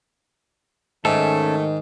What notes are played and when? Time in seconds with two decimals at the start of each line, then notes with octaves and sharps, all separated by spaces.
1.05 G#2 D#3 A3 C#4 A4